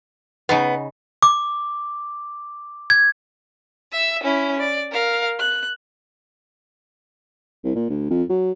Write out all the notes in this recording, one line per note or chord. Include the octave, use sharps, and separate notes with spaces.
C#3 B3 D#4 F5
D6
G#6
E5 E6
C#4 E4
D5
A#4 F5
F#6
C2
A#2
D2
F2
F#3